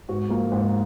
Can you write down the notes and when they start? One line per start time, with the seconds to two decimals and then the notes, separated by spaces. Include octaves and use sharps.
0.09 G#2 F#4
0.29 F3 A#3
0.52 G#2